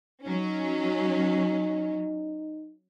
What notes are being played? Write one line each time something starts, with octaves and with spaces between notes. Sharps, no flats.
F#3 C#4 D#4